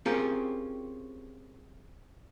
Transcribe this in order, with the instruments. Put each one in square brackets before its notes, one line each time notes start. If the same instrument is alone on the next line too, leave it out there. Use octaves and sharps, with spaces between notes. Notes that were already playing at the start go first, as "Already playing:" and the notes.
[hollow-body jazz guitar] C4 C#4 F4 G4 G#4 A#4